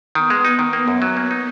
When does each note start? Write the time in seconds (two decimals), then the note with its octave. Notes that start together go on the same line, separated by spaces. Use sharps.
0.15 D#3 B3
0.30 G#3
0.45 D#4
0.59 D#3
0.73 A#3
0.88 F#2
1.02 F#3 B3
1.17 A#3
1.31 D#4